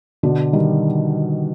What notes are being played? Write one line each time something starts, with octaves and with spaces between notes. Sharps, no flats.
B2 D3
D#3 G3